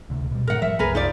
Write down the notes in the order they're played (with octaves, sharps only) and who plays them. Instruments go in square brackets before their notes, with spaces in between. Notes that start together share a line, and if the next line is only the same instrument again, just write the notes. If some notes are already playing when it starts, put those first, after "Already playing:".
[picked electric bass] D2 C3
B2 G3
[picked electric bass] G#2 C#3 [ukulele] A#4 F#5
[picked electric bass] F3 G3 [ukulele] E5
[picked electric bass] F#1 C2 [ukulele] G#4 A#4 B4
[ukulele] D#4 F4 D5